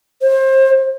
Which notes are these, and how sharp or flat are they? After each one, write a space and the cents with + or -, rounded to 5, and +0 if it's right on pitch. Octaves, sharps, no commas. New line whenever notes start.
C5 +30